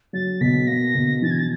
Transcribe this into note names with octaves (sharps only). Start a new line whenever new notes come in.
F#3 A6
B2 B6
A#3 A#6
B2
E3 A6
G#6
A6